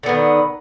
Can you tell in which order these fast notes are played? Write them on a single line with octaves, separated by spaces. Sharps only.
D3 B3 D#3